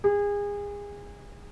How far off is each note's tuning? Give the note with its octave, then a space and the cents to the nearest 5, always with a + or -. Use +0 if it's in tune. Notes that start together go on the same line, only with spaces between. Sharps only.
G#4 -30